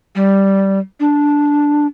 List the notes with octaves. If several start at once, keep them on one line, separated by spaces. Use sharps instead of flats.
G3
D4